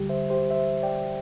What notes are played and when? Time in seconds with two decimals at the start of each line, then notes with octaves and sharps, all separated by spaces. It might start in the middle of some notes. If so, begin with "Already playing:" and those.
Already playing: D2 D3 G3 G4
0.09 C5 E5
0.30 G4 C5
0.51 C5 E5
0.83 D5 G5